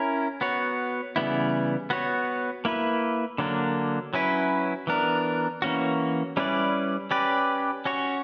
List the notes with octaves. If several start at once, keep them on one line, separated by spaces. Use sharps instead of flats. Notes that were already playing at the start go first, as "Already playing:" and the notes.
Already playing: C#4 E4 A#4
B3 F#4 C#5
C#3 E3 G3 B3 E4
B3 F#4 C#5
A#3 E4 B4
D3 F#3 A#3 D4
F#3 C#4 E4 B4
E3 B3 D4 A#4
E3 A#3 C#4 F#4
G3 C#4 E4 B4 D5
C#4 G4 B4 D5
C#4 F#4 C#5